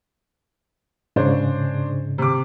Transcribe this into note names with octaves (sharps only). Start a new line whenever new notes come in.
G#2 C#3 D4 C5 C#5
C3 D6